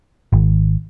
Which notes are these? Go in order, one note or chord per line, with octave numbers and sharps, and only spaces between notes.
G#1